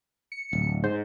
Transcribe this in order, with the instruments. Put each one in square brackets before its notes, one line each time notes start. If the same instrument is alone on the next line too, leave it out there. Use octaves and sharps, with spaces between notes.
[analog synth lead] C#7
[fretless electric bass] D1
[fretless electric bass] G#2 [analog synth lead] C5